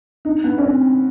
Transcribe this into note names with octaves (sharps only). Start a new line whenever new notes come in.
D#4
B3
C#4
C4